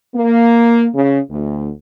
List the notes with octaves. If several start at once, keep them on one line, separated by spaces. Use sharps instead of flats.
A#3
C#3
D2